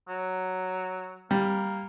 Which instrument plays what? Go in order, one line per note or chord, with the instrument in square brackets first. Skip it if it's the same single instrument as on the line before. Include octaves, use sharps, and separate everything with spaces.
[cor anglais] F#3
[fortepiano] G3 [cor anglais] A#3